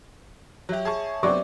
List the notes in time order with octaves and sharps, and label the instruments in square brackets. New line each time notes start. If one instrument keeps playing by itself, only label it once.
[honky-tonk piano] F#3 G4 [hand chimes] C#5 E5
[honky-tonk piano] G#4 A5 C#6
[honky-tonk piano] F#3 B3 C4 [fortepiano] D5 C#6 D6